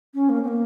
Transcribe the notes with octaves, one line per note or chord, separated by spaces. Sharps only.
C#4
A#3
C4
A#3